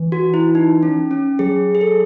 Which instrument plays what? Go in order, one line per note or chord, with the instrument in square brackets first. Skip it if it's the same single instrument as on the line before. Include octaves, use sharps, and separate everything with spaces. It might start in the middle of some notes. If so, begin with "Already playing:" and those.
Already playing: [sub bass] E3
[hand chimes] F#4
E4
D#4
C#4
C#4
[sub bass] F#3 [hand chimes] G#4
[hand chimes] G#4
A4